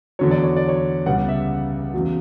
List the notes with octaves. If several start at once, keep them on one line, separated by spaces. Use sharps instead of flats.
E2 D3 F#3 C#5
D5
C#5
D5
C#5
C#2 C#3 G3 B3 F#5
E5
E2 C#3 F#3